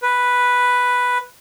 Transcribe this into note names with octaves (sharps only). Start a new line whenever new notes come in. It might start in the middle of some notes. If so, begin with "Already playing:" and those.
B4